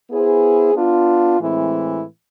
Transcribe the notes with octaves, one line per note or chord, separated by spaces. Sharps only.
B3 E4 G#4 C5
B3 D4 F4
A2 E3 G#3 C4 E4